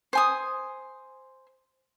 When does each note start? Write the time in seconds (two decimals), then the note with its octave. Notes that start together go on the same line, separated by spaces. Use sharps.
0.13 C5 G#5 D#6